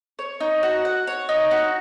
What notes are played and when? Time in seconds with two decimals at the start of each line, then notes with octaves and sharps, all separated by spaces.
0.19 C#5
0.41 D#4
0.63 F#4
0.85 F#5
1.07 C#5
1.29 D#4
1.51 F#4